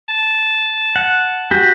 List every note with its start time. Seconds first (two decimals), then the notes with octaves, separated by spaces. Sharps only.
0.08 A5
0.96 F#5
1.51 F#4 G4